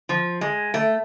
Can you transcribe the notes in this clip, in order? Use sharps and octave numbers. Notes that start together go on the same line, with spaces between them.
F3
G#3
A3